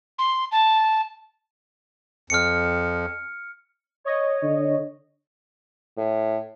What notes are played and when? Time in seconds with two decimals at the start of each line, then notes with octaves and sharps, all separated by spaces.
0.19 C6
0.52 A5
2.30 F2 F6 C#7
4.04 C#5 D#5
4.43 D3
5.97 A2